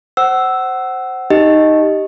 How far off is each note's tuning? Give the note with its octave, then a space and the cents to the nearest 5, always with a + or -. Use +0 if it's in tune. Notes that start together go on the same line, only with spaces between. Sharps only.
C5 +0 F#5 +25 E6 +0
D#4 +0 G4 +0 D#5 +0